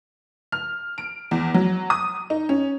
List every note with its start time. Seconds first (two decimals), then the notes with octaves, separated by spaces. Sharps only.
0.52 F6
0.98 D7
1.31 E2
1.54 F#3
1.90 D#6
2.30 D#4
2.49 C#4